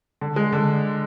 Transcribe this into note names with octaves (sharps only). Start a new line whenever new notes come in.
D3
G#3
D3